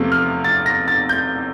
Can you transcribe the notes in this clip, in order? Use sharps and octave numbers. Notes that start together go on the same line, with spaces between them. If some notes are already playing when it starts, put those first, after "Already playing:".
Already playing: E2 C3 F3 A3
F6
A6
A#6
A6
G6